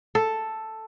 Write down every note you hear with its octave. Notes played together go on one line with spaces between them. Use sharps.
A4